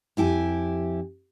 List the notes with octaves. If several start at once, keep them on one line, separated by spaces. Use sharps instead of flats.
F2 E4 G4 G#5